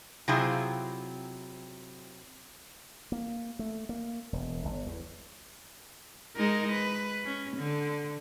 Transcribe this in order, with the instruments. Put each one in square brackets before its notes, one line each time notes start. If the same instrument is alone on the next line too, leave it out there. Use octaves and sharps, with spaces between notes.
[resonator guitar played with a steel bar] C3 F#3 C4 E4 F4 G#4
[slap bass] A#3
A3
A#3
E1
G1
E2
[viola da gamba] G#3 D#4 A#4
B4
C#4
D3